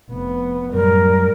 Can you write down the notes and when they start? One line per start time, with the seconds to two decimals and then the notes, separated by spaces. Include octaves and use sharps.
0.11 F1 B3
0.73 F#2 A2 G3 A#4